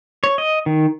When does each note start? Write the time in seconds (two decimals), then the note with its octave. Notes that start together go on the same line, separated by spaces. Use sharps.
0.24 C#5
0.38 D#5
0.66 D#3